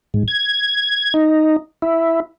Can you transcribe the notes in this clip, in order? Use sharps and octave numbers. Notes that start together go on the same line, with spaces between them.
G#2
G#6
D#4
E4